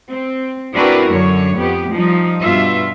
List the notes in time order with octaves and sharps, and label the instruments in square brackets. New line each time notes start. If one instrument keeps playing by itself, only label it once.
[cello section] C4
C4 D4 E4 F#4 A#4 B4
F#2 D3 C#5
F2 B3 G4
F3 G3 D#4
G2 B2 F4 E5